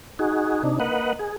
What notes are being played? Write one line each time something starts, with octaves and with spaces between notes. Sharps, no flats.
D#4 F#4 G#4
C3 D4 D#4
A#3 B4 D#5 F#5
G#4